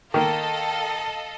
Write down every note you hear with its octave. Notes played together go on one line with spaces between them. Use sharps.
D#3 A#3 A4 D#5 F5